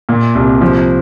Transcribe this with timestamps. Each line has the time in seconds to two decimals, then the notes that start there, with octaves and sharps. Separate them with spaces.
0.09 A#2
0.35 C2
0.61 F3